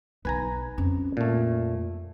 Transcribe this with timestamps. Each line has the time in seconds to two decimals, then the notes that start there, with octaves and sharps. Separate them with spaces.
0.25 B1 D#4 B4 G#5 A#5
0.78 F2 C#4
1.17 A#2 A3